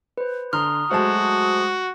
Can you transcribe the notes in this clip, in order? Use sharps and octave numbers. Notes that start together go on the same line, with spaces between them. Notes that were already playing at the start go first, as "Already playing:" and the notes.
B4 C5
D3 A#5 C6 D#6 F6
F#3 G#3 A3 F#4 C5 A5